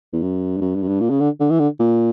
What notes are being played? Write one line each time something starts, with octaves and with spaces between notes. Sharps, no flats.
E2
F#2
G2
F#2
G2
F#2
G2
A#2
C#3
D3
D3
E3
D3
A#2